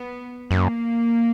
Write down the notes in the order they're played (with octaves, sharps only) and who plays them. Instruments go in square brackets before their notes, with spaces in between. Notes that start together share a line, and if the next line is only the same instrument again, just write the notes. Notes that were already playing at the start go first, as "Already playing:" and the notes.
Already playing: [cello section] B3
[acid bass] F#2 [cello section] A#3